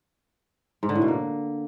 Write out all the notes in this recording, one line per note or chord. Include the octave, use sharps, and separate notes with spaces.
G#2
D3
A2
B2
A#3